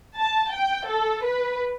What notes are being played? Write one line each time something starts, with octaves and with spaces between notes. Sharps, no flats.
A5
G5
A4
B4